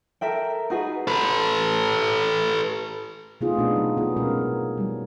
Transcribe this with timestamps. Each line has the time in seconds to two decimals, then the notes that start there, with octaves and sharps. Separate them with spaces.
0.21 A4 A#4 E5 G5
0.70 D#4 F#4 G#4 B4
1.07 A4 B4
3.41 C3 A3 B3 D#4 F4 G#4
3.58 B2 B3 D4 D#4
3.76 F#3
3.97 B3 F4 G#4
4.16 B2 G#3 C#4 A#4 C#5
4.77 F#3 G3